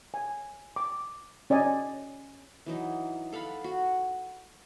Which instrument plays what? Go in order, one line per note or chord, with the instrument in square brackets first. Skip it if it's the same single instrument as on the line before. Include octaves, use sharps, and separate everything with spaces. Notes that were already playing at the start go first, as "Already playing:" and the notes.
[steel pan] G#5
D6
C#4 D5 D#5 G#5
[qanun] E3 F#3 D#4
A4 F5 F#5 B5
F#4